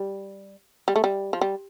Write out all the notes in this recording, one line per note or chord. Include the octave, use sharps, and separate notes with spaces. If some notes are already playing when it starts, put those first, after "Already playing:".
Already playing: G3
G3
A3
G3
F3
G3